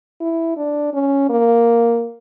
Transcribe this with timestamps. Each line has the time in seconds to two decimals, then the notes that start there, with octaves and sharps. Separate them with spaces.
0.21 E4
0.57 D4
0.94 C#4
1.30 A#3